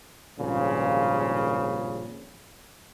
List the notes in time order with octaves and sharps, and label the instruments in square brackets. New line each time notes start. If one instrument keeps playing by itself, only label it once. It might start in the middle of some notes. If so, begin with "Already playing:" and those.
[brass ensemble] G#1 G2 A#2 C#3 F3